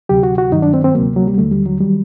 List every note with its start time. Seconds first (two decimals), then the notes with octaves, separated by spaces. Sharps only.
0.09 D2 C3 F#3 G4
0.23 F#4
0.38 F#4
0.52 G2 D#3 F#3 D#4
0.62 D4
0.74 C4
0.84 C4
0.95 D2 C3 F#3 A#3
1.16 F#3
1.27 G3
1.38 D#2 D3 F#3 A3
1.52 G3
1.66 F#3
1.80 D#3 F#3 G3